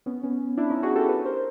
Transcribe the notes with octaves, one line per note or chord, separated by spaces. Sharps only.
B3 C#4
B3 C#4
D4 E4
C#4 D#4
F#4 G#4
G4 A4
A4 B4
A#4 C5